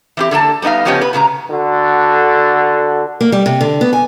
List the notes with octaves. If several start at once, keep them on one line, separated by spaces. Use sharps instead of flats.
E3 C4 G4
D3 A#3 A4 A5
G3 B3 D#4 D#5 F5
C#3 F3 B3 C#4 G4 D#5
B4
A#2 C#3 G#3 A#5
D3 F#4 A4
A#3
G3
C3
D3
B3
G#5